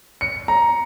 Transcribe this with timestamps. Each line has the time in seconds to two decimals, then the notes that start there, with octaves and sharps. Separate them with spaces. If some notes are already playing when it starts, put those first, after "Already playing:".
0.21 C#7
0.48 A#5